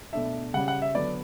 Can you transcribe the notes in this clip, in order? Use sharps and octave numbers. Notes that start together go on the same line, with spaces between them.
B2 A3 D4 E5
C#3 G3 C#4 F#5
F#5
E5
D3 F#3 B3 D5